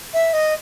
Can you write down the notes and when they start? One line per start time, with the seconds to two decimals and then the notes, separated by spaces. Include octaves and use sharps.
0.13 E5
0.33 D#5